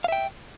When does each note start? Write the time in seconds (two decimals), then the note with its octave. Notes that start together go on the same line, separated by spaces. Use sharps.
0.04 F5
0.08 E5
0.12 G5